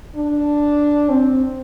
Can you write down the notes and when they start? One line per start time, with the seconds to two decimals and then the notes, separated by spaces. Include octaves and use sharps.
0.16 D4
1.10 C4